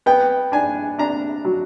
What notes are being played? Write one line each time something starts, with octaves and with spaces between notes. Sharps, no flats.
B3 G5
D4 G#5
D4 A#5
F#3